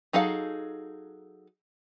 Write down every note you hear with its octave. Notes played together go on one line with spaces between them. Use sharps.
F#3 D#4 G#4 A4 F5